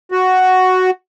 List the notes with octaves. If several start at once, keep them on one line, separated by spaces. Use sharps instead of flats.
F#4